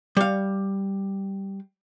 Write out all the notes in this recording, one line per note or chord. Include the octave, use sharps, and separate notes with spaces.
G3 F5